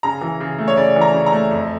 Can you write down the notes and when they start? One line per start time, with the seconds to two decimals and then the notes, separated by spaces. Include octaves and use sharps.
0.03 C#3 A#5
0.21 E3
0.40 C#3
0.58 A3
0.68 C#5
0.77 C#3 D5
0.96 E3
1.01 A#5
1.13 C#3
1.26 A#5
1.32 A3
1.51 F2